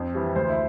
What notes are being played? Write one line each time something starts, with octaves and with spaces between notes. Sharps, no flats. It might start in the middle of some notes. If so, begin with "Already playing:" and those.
Already playing: F2 C5
E3 G3
D2 C5
E4